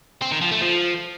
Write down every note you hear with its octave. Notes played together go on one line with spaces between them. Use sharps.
C4
D#3
F3
A3
F3